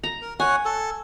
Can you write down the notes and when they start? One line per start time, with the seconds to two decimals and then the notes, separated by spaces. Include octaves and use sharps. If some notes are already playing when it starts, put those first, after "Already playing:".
0.03 A#5
0.22 A#4
0.40 C#5 F#5 G#5
0.65 A4